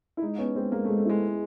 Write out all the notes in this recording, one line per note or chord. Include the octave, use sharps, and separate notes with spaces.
E4
G#3 D#4
B3 C#4
G#3 C4
G#3 A#3
G#3 A3
A3
G#3 E4